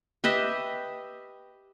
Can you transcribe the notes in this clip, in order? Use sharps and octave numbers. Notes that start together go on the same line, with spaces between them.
G4 B4 D#5 E5